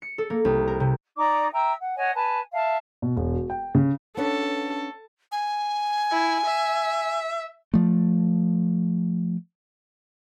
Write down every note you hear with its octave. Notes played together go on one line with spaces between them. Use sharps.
C#7
A4
A#3
C2
A#4
C3
D#4 D5 A#5 D6
E5 G5 A#5 E6
F#5
C#5 D#5 F#5 G#5
B4 G#5 A5
E5 F5 A5
B2
E1
F#4
G5
C#3
B3 C#4 D4 A4
G#5
E4
E5
F3 A3